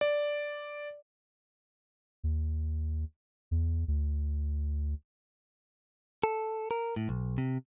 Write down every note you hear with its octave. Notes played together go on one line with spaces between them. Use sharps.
D5
D#2
E2
D2
A4
A#4
A2
B1
C3